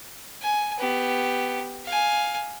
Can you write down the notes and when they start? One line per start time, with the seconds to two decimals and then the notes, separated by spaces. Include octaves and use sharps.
0.42 G#5
0.79 B3 G4
1.85 F5 G#5